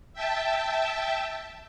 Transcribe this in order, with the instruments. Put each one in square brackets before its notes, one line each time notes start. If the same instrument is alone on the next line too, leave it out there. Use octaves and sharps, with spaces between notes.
[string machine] E5 G5 A5